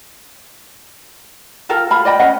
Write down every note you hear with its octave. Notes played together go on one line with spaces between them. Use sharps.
F4 A4 A#4 G5
F4 A4 B5
D5 D#5 G5 B5
C#4 D#5 F#5